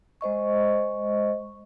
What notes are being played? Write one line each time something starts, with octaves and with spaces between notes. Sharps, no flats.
G#3 C5 D#5 C#6